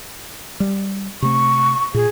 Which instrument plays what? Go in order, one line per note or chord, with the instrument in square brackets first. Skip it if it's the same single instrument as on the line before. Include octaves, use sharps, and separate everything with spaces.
[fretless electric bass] G3
[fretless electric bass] C3 A3 [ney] C#6
[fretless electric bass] A#2 [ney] G#4